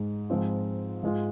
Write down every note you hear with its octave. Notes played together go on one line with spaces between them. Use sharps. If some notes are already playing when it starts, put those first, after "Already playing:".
Already playing: G#2 G#3 D#4
G#2 F3 G#3 C4 F4
G#2 G#3 F4